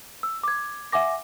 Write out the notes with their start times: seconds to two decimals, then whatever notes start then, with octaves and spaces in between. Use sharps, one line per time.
0.23 E6
0.43 D6 G#6
0.92 E5 F#5 G#5 D6 A#6